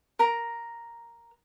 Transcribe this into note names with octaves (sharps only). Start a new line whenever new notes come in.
A#4 A#5